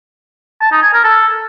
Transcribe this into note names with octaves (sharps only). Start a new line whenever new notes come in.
A5
D#4
G#5
A#4
A4